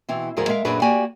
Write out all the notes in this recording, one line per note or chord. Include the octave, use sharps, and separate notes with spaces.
B2 E3 C4
D2 G#2 F3 G#4 A#4 C5
G#3 A#4 E5 F5
F#2 A#2 D4 F#4 G#4 B4
A#3 F#4 G4 D5 G5 G#5